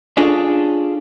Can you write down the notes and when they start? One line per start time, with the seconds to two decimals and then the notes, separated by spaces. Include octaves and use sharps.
0.17 C#4 D4 F4 G#4 A4